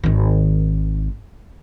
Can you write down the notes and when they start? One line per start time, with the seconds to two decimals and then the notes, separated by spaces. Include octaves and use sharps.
0.04 G#1 D#3